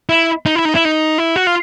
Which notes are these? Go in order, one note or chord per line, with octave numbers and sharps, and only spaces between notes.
E4
D#4
E4
D#4
E4
D#4
E4
F#4
F4